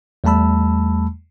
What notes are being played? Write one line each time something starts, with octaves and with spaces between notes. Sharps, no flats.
E2 G3 A3 A5 B5 E6